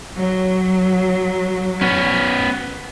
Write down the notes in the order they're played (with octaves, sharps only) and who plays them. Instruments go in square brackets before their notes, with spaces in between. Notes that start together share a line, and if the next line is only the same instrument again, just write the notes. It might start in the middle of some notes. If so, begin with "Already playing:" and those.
[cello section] F#3
[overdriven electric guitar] B3 C#4